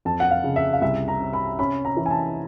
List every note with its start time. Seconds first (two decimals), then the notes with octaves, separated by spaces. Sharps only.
0.05 F2 A5
0.20 F#5
0.31 F5
0.44 C#3
0.56 E5
0.73 F5
0.82 C2 E5
1.08 A#5
1.21 C3
1.33 B5
1.59 C#4 B5
1.85 A#5
1.97 E3
2.06 G#5
2.11 A5